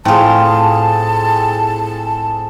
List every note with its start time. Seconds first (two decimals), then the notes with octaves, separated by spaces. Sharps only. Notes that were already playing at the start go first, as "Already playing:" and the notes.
0.05 A2 C4 F4 G#4 A5